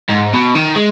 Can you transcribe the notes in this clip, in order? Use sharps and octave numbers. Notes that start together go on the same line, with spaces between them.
G#2
B2
D#3
G#3